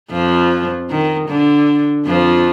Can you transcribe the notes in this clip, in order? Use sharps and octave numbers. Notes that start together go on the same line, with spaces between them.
F2 F3
D#3
D3
F2 F3